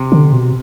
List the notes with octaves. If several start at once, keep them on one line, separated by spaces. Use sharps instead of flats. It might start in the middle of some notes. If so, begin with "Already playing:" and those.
Already playing: C3
D3
B2